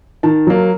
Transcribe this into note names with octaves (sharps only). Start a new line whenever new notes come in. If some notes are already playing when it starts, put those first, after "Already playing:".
D#3 A5
F#3 A#3